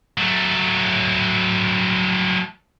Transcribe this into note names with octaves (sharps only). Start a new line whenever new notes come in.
F#3 A3